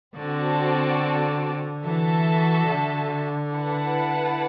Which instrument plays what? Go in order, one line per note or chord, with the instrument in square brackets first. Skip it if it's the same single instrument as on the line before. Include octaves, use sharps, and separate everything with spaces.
[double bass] D3 [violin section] C4 F#4 A4 D5 A5
[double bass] E3 [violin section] F#4 A4 E5 A5
[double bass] D3
[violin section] E4 B4 F#5 A5